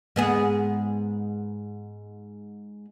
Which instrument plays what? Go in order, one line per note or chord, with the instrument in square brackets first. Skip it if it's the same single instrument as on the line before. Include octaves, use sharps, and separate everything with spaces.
[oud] G#2 B3 G#4